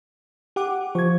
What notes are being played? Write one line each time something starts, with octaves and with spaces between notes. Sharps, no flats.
G4 F#5 D6
F3 C#6 G#6